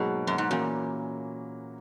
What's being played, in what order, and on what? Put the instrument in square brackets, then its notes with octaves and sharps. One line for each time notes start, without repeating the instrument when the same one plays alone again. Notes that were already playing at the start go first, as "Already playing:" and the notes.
Already playing: [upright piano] G#2 F#3 A#3 D#4 [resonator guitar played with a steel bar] B2
[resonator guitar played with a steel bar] F#2
G#2
[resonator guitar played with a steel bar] A#2 [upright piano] E3 A#3 C#4 F#4